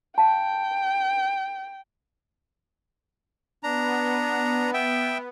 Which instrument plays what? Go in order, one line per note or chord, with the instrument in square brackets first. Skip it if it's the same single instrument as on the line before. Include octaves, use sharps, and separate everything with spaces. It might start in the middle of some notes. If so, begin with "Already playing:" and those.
[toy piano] F5 A5 [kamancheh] G5
[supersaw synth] B3 [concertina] D4 A#5
[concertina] E5 G5